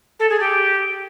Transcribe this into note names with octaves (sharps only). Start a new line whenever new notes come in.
A4
G#4
G4